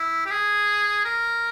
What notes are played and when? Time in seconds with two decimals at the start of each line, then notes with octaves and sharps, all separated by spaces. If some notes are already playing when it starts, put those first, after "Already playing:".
Already playing: E4
0.26 G4
0.31 G#4
1.05 A#4